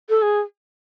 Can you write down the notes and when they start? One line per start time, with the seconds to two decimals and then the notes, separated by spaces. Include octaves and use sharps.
0.09 A4
0.22 G#4